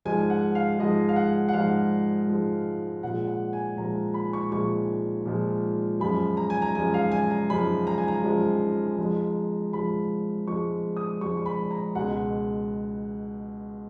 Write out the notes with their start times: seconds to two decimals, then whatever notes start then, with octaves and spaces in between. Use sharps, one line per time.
0.05 G#2 F3 G#3 G#5
0.30 F#5
0.55 F5
0.79 G#2 F3 G#3 D#5
1.09 F5
1.16 F#5
1.49 F#5
1.53 G#2 F3 G#3 F5
2.28 G#2 F3 G#3
3.03 A#2 F3 G#3 F#5
3.27 F#5
3.53 G#5
3.77 A#2 F3 G#3 A#5
4.14 B5
4.33 C#6
4.52 A#2 F3 G#3 C#6
5.25 A#2 F3 G#3
6.00 F#2 F3 G#3 B5
6.37 A#5
6.50 G#5
6.62 A#5
6.75 F#2 F3 G#3 G#5
6.94 F5
7.12 G#5
7.31 A#5
7.49 F#2 F3 G#3 B5
7.87 A#5
7.98 G#5
8.08 A#5
8.23 F#2 F3 G#3
8.98 F2 F3 G#3
9.73 F2 F3 G#3 B5
10.47 F2 F3 G#3 C#6
10.97 D#6
11.21 F2 F3 G#3 C#6
11.37 C#6
11.46 B5
11.71 A#5
11.95 C#2 B2 G#3 F#5